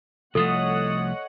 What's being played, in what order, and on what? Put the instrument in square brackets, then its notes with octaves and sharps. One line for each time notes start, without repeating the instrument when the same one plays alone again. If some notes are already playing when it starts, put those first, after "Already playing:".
[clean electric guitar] C2 F3 A3 [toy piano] A4 [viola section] C#5 D#5 F#5 [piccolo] D#6